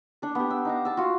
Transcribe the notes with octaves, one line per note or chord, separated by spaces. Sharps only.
D4 A4
B3 G4
E6
D#4 F5 A#5
A5 E6
F4 F#4